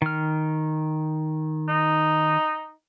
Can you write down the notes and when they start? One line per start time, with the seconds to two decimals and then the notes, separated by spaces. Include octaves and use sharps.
0.02 D#3 F6
1.68 D#4